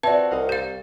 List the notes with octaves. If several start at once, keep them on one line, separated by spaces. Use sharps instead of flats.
C4 F4 F#4 B4 D5 E5 A5
C2 D#5 F5 F#5
G4 F5 G6 A6